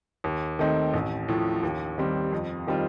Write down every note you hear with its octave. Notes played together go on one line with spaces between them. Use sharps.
D#2
D#3 A3 C4 D#4
A1
A2 F3
D#2
D#3 G3 C4
F2
D#3 G3 C4 F4